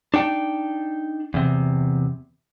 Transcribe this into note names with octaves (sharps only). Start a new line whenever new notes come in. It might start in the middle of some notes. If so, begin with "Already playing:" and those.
D4 D#4 G5
E2 C3